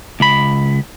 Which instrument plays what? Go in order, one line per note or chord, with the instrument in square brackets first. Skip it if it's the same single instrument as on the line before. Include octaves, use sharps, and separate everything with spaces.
[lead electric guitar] C#2 B5